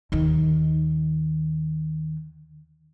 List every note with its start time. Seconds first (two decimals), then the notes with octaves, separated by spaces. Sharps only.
0.12 D#2 D#3